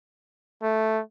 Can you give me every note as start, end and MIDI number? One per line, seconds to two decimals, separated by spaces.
0.63 1.01 57